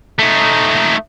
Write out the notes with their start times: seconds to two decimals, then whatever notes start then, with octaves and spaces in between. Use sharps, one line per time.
0.19 A3 D#4